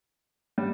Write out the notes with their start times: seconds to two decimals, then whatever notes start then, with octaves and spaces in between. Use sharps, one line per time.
0.58 G3